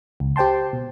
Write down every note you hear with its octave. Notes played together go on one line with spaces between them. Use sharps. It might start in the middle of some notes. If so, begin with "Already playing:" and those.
C#2
G4 C5 G5 A5 C6
B2